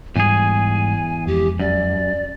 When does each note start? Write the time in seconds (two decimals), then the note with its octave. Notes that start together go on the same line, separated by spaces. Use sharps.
0.16 E2 G#2 G3 G#4 G#5
1.27 F2 G#3 G4
1.59 F#2 D5